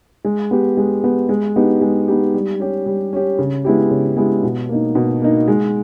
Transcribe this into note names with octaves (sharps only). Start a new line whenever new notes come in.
G#3
B3 G4
G#3
B3 G4
G#3
B3 D#4 G4
G#3
B3 D#4 G4
G3
C#4 G4
G3
C#4 G4
C#3
G#3 B3 E4 G4
C#3
G#3 B3 E4 G4
B2
A#3 D#4
B2
A#3 D#4
G#3